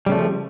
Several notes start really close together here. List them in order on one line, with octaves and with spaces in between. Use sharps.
G3 C#3 A3 F3